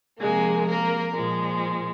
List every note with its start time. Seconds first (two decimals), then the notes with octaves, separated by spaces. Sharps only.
0.19 C3 F3 G#3 A#3 G#4
0.66 A#3 A#4
1.14 A#2 F3 G#3